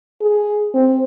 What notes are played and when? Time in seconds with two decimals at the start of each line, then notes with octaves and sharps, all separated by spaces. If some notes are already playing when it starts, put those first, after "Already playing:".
0.21 G#4
0.74 C4